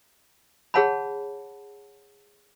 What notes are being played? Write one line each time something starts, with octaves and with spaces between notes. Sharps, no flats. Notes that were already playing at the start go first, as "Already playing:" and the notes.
G#4 C#5 F#5 A5 B5